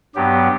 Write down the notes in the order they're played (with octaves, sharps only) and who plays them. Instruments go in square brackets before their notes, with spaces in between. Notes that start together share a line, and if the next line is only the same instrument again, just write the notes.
[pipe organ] G2 F#3 B3 G4